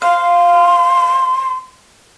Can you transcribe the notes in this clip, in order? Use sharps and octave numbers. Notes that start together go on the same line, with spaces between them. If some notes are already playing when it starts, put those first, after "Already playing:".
F5 C6